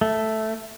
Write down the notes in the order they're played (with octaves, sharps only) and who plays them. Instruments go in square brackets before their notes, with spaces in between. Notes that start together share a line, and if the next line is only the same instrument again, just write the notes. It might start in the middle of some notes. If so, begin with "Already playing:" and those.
[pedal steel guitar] A3